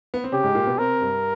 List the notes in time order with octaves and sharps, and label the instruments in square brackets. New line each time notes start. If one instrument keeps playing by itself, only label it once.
[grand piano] B3
C4
[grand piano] C#3 C#4 [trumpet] G4
[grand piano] G#2 G#3
A#2 A#3
B2 B3
[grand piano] C3 C4 [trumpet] A#4
[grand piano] G2 G3